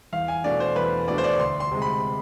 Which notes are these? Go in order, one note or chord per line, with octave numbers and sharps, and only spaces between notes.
E2 F5
G#5
B2 A3 D4 D5
C5
E2 B4
B2 A3 D4 D5
C5
D5
D2 C6
C6
C3 G#3
B5